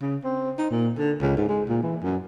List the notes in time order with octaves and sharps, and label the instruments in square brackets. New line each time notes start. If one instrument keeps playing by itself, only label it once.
[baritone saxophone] C#3
C4
D#4
A#2
D3
C#2
G#2
G#3
A#2
E3
F#2